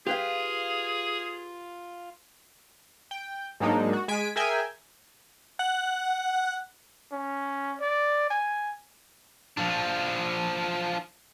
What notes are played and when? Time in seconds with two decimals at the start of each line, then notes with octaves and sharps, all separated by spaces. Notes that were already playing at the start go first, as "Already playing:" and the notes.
0.07 F4 G4 G#4 B4 F5
3.11 G5
3.60 G#2 F#3 G#3 A#3 D4 D#4
3.93 F#4
4.08 G#3 G#5 B6 D7
4.36 G#4 A#4 E5 G5 G#5
5.59 F#5
7.12 C#4
7.80 D5
8.30 G#5
9.57 F3 D4